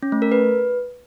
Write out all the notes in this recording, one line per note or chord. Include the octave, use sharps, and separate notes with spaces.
C#4
A3
A#4
B4